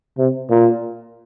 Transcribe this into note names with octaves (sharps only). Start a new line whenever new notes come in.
C3
A#2